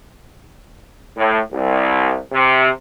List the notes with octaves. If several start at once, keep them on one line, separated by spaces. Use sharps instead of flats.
A2
C2
C3